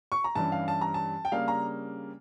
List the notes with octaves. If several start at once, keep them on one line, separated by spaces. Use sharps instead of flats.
C#6
A#5
G2 E3 G3 C#4 A5
F5
A5
A#5
A5
G5
C#3 G3 A#3 D4 F5
A#5